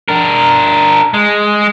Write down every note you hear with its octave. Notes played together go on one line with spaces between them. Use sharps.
D4 A#4
G#3